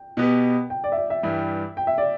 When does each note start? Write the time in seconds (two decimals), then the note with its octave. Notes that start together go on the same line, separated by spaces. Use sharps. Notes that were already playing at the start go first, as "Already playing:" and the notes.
Already playing: G5
0.17 B2 B3 G4
0.70 G5
0.84 D5
0.92 E5
0.97 D5
1.10 E5
1.23 G2 E3 G3
1.77 G5
1.87 E5
1.98 D5